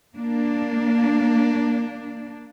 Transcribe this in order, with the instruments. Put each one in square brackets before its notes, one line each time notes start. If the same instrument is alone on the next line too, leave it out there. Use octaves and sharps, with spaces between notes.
[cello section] A#3 D4